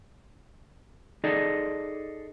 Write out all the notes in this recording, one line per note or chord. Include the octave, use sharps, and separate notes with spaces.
D#4 G#4 A4 D5 D#5